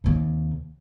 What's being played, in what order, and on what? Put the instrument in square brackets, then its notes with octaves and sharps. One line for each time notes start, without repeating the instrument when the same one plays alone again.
[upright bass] D#2 C3